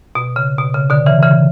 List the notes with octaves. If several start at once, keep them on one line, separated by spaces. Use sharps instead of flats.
B2
C#3
B2
C#3
B2 D3
C#3 E3
C#3 E3